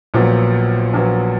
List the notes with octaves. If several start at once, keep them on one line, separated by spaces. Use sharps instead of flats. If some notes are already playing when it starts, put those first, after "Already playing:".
A#1 A#2 F#3 B3
A#1 A#2 F#3 B3